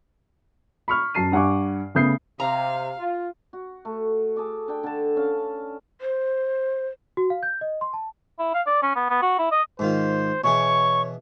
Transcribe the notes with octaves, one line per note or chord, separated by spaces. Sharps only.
B5 C#6 F6
F#2 A5 C7 D#7
G2 F#5 G#5 C#6 D6
C#3 A3 B3 D#6 G6 C7
C3 F5 A#5
F4
F#4
A3
G#4 A4 D6
D4 G5
D3 A5
C#4 F5
C5
F#4
F5
G6
D#5
C6
A5
E4
F5
D5
C#4
B3
B3
F#4
E4
D#5
G#2 D#3 F4 C5
B2 E3 G#4 C#5 C#6